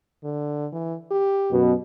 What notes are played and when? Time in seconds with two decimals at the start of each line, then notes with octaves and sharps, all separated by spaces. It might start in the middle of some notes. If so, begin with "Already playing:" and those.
0.24 D3
0.72 E3
1.11 G4
1.50 F#2 B2